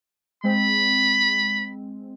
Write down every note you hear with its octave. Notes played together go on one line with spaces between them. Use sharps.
G#3 C4 B5